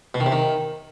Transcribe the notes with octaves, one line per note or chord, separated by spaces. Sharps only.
B2
D#3
C3
D#3